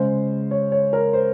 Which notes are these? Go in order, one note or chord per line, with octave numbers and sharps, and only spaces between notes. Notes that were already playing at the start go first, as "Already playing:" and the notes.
Already playing: C#3 G#3 C5
C#5
C#5
A#4
C5